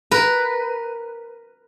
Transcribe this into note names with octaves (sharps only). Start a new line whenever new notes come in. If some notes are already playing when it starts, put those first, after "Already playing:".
A#4 B4